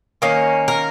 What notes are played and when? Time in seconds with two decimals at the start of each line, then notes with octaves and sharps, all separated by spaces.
0.22 D#3 A#3 C#4
0.68 A#4